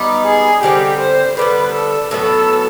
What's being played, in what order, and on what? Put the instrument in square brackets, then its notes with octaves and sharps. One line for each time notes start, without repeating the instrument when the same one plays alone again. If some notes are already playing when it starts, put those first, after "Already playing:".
Already playing: [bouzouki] G3 B3 D#4
[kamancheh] G#4
[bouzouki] D3 G3 C4 [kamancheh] G4
[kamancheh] C5
[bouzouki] D3 G3 B3 [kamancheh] B4
[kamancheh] A4
[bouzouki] A2 F#3 B3 [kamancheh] A4